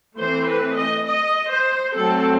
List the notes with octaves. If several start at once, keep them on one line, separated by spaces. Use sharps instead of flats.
E3 A3 C4 C5
B4
D#5
D#5
C5
F#3 A3 C4 A4